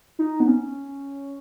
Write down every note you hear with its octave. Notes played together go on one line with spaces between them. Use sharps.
D#4
B3
C#4